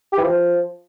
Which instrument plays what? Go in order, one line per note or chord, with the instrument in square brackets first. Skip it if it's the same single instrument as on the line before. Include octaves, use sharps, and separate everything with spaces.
[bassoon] G4
E3
F3